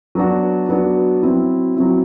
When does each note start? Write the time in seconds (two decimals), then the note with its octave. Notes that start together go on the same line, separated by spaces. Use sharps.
0.15 F#3 B3 D4 F#4
0.69 F#3 B3 D4 F#4
1.23 F#3 C4 E4
1.76 F#3 C4 E4